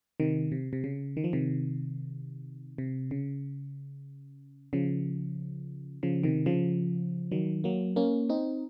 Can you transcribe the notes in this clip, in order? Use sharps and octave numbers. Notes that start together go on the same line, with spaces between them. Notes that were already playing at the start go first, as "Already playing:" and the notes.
C3 D#3
C3
C3
C#3
D#3
F3
C3 D#3
C3
C#3
C#3 F3
C#3 F3
C3 D#3
C#3 F3
D#3 F#3
F#3 A#3
A#3 C#4
C4 D#4